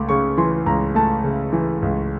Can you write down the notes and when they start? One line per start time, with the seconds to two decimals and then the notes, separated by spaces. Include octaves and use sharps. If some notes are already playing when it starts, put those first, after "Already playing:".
Already playing: C#2 A3 D6
0.09 C#3 C#6
0.37 E3 C6
0.66 C#2 A#5
0.95 A3 A5
1.24 C#3
1.53 E3
1.82 C#2